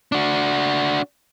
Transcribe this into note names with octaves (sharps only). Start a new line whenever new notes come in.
D4 F#4